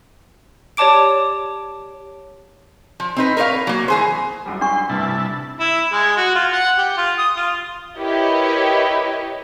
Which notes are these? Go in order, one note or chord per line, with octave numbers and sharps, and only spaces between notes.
G4 C#5 D5 A5 D6 D7
F3
C4 D#4 B4
A#4 B4 C#5 D5 F5
F#3 A#3
E3 G#4 C5
G#1 F#2 G3
D4 C6 C#6
A1 G2 C3 E4 A5
E4
G#3
F#4
F4
F#5
G4
F4
D#6
F4
E4 G4 A#4 B4 C#5 D#5